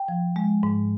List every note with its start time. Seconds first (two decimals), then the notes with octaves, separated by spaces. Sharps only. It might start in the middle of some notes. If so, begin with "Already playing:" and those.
Already playing: G5
0.08 F3
0.36 G#3
0.63 G#2